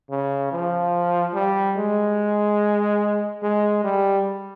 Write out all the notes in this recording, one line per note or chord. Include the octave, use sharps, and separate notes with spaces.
C#3
F3
G3
G#3
G#3
G3